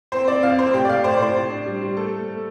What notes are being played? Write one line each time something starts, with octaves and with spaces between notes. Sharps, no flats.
C4 C5
C4 D5
F2 F5
C4 C5
A2 G4
D5
A2 F5
A2 C5
D5
A2 C5
A2
D4
G3
G3
A3 A4
A3
A3